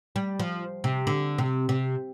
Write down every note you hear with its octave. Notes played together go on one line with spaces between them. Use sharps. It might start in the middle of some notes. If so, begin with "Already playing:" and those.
G3
F3
C3
D3
C3
C3